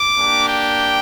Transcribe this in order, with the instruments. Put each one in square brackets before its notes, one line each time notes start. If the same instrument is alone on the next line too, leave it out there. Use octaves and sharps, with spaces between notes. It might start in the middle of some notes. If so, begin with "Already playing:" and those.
Already playing: [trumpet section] D6
A#3 D4 G4
G5